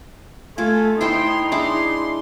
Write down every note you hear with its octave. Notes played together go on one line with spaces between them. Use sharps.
A3 F4 A4 G#5
D#4 E4 C5 G5 C6
G#3 D4 E4 C6